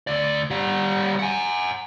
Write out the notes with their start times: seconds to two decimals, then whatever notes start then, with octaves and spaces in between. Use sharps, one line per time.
0.07 D2 D5
0.51 G3 F#5
1.19 F#5 G#5